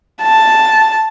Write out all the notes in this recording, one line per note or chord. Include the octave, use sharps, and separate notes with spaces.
A5